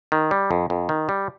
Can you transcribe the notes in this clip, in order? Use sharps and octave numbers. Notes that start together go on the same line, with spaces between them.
D#3
G3
F2
F2
D#3
G3